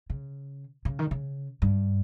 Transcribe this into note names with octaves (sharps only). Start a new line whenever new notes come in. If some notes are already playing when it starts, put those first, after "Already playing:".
C#3
C#3
D#3
C#3
G2